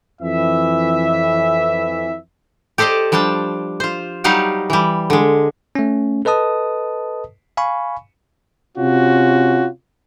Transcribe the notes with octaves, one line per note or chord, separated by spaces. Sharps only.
F2 E3 E5
G4 A4 C5 D5 D#5
F3 G3 D4 G5 A5
F4 C5
F#3 G3 D#4 G4 F5 F#5
E3 G3
D3 G#3
A3 C#4
A4 B4 D#5 A5 D#6
F5 G#5 B5 C#6
C3 C#4 F4 F#4